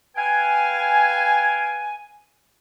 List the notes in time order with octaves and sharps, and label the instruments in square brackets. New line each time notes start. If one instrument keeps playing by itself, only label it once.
[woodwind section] B4 F5 G5 G#5